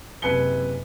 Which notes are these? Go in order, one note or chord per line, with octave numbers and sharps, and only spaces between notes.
F#1 C3 B4 G#5 C#7 G7